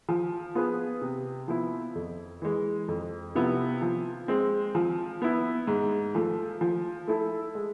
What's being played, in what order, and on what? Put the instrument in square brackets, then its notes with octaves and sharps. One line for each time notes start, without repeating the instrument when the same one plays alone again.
[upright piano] F3
B3 F4 G#4 B4
C3
F3 B3 E4
F2
E3 G#3
F2
C3 F3 B3 E4
F3
G#3 C4
F3
B3 E4
G#2
F3 A3
F3
A3 E4 A4
G#3